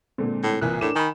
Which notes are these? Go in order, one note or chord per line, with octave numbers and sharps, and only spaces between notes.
A#2 D3 G#3 C4
A2
C2 A#2 E3 F#6
A2 D4 A#4 D6 E7
D#3 G#5 B5